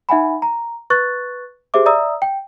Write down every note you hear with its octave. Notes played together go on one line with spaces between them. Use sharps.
D#4 E5 F#5 G#5 B5
A#5
B4 C#6 F#6 A6
G4 G#4 C5 E5 D6
D5 E5 A#5 D#6 E6
G5